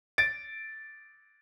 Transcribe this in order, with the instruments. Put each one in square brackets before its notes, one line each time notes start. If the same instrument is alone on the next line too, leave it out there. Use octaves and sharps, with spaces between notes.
[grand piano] A6 D7